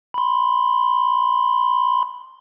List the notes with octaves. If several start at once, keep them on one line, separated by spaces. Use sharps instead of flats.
B5 C6